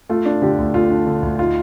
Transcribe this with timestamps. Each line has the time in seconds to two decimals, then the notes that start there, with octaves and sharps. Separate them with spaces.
0.09 A3 F4
0.26 D4
0.42 D3 G4
0.58 D2
0.74 A3 F4
0.90 D4
1.06 D3
1.22 D2
1.39 D#4 F4